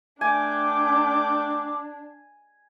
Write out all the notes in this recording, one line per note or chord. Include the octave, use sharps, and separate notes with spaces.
A3 D4 G5 G#5 D6